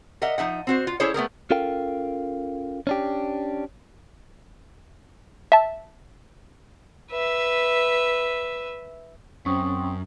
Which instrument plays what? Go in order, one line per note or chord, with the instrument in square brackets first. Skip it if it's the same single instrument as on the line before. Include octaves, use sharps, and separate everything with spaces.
[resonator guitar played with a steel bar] A#4 D#5 E5 F#5
F3 D#4 E5 F#5
C4 F#4 C5
F4
C#4 E4 G#4 A4 C5 C#5
A3 B3 G#4 A#4
[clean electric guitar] C#4 F4 A4 A#4 F5 G5
C#4 D4 G4
[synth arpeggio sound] E5 A5
[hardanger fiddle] B4 E5
[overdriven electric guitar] F#2 [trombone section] C4 [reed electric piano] C#4 [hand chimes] C#6 D#6